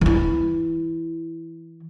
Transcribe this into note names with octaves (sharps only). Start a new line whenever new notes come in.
E3 E4